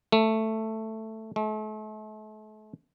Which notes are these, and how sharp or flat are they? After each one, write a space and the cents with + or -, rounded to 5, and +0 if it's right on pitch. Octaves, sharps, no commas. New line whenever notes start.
A3 +5
A3 -40